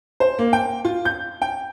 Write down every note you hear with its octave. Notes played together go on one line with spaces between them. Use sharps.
C5
A#3
G5
F4
G6
G5